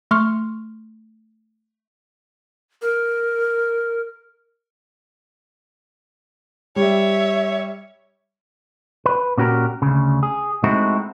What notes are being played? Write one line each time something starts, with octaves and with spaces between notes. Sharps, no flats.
A3 C6 C#6 F6
A#4
G3 C#5 E5
B4
A#2 C#4 F#4 G4 A#4
D2 C#3
G#4
G#3 A3 C4 D#4 E4 F#4